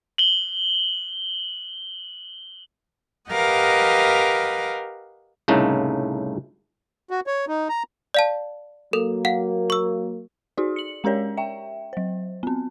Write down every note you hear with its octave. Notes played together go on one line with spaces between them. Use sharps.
F#7 G7
G4 A#4 B4 D#5 F5 F#5
C2 A2 C#3 A3 A#3 D#4
F#4
C#5
D#4
A#5
D5 F5 A5
F#3 A#3 A4 A#4
F5 F#5
C#6 E6
D#4 F#4 G#4 D5
C#7 F#7
G#3 C#4 G4 A#4 C#5 D5
E5 G5
F#3 C5
B3 C4